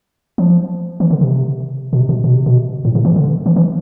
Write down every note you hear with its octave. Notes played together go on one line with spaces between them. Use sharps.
F3
E3
D3
C3
B2
C3
B2
B2
C3
B2
A2
C3
E3
D3
E3
E3